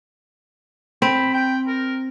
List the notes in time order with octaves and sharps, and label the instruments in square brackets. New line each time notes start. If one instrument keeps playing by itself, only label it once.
[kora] C4 [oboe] B5
[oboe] G5
A#4